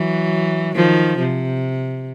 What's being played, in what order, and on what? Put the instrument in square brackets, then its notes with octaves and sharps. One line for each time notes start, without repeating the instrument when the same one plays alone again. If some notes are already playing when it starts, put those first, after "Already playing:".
Already playing: [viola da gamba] E3 F#3
D#3 F3
C3